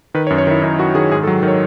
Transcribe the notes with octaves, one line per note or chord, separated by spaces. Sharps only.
D#3 B4
C#5
F#2
C#5
D#3 E4
F#2 D#4
F#2 F#4
D#3 G#4
G#2 G#4
A4
F#3
D#3 C#5